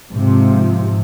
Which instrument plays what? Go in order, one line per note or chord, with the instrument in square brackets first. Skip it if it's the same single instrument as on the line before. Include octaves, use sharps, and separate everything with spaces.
[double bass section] G#2 C3 F3